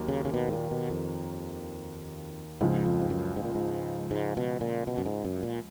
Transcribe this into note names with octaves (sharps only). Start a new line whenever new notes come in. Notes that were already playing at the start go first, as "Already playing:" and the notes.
Already playing: D#2 D#3 F#3 A#3
C#3
C#3
B2
G#2
A#2
B2
F2
C#2 G#2 C#3 F3
F2
G#2
F#2
G#2
A#2
G#2
G#2
B2
A#2
B2
F#2
G#2
F#2
A#2